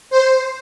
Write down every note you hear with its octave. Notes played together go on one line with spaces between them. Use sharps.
C5